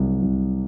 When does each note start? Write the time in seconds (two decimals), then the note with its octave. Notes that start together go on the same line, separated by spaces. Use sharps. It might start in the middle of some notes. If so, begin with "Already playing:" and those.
Already playing: C2 C3 F#3
0.22 C2